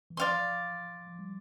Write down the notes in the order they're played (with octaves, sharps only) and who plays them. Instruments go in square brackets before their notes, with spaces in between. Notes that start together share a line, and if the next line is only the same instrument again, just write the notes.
[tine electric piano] E3
[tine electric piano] F3 [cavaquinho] D5 F5 C6
[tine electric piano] F3
G3